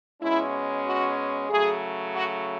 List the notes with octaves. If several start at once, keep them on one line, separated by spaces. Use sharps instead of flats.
B2 G#3 C#4 E4
F#4
C#3 F#3 A3 G#4
F#4